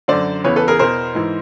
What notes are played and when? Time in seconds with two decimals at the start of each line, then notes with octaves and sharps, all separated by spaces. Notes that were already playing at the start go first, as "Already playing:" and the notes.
0.08 F#2 D3 C5 D5
0.44 E2 C#3 E3 B4 C#5
0.56 A4 B4
0.68 G#4 A#4
0.79 E2 B2 A#4 C5
1.15 G#2 E3